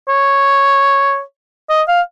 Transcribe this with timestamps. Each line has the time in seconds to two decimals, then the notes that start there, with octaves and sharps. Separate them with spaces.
0.09 C#5
1.70 D#5
1.88 F5